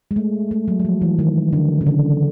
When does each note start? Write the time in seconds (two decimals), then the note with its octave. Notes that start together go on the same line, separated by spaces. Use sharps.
0.11 G#3
0.16 A3
0.51 A3
0.68 F#3
0.79 F#3
0.85 F3
1.01 E3
1.19 D#3
1.53 D3
1.81 C#3
1.86 D3